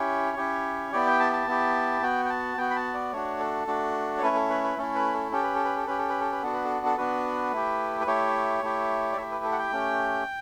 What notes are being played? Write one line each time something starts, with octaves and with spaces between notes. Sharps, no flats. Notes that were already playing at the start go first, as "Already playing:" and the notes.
Already playing: C#4 E4 G4 C#5
C#4 E4 G4
B3 E4 G4 D5
G5
A5
A5
B3 E4 G4
B3 F#4 G5
G5
A5
B3 F#4 G5
B5
A5
D5
A3 D4 F#4 C#5
A4
A3 D4 F#4
C#5
A3 C#4 E4 B4
A4
B4
B4
A3 C#4 E4 A4
B4
A4
C#4 G4 A4
B4
A4
B4
A4
C#4 G4 B4
A4
B4
A4
B4
B3 D4 F#4 A4
B4
A4
A4
B3 D4 F#4 B4
A3 E4 G4
B4
A3 E4 G4 C#5
A3 E4 G4
D5
A3 E4 G4 E5
B4
A4
F#5
G5
A3 C#4 G4